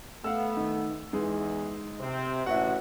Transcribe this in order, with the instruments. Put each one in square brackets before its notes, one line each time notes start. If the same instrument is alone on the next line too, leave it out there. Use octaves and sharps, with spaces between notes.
[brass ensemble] A3 B3 [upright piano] F5 F#5 E6
[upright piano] D#3
[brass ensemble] E2 [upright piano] G#3 D#4
[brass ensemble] C3 C4
[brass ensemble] A1 F#4 [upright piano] E5 F#5